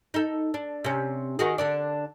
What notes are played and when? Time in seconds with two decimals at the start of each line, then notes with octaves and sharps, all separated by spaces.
0.14 D#4 A4
0.54 D4
0.84 C3 C#4
1.39 D#3 F#4 G#4
1.58 D3 D4 D5